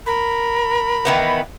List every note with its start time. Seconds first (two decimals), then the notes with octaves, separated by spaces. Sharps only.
0.06 A#4 B5
1.05 D#3 E3 B3